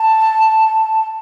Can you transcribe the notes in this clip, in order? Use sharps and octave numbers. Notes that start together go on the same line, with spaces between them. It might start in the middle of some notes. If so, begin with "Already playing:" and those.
Already playing: A5